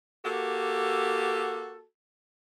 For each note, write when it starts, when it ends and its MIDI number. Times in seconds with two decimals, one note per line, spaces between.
0.24 1.82 58
0.24 1.82 66
0.24 1.82 67
0.24 1.82 69